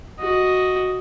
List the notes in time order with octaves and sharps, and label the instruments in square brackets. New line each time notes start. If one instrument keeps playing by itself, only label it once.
[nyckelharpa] F#4 D#5